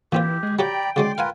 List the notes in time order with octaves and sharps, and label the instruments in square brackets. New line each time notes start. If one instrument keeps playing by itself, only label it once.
[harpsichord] A#2 C4 F4 [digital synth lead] E3 [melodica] G4
[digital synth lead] G#3
[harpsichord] F#3 G4 F#5 [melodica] D5 A#5 B5 [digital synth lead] G5
[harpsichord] C#3 F#3 G#3 [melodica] D5 C6 D6
[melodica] F4 A#4 B4 [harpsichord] F5 F#5 G#5